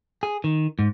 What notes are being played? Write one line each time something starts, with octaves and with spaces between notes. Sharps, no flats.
G#4
D#3
G#2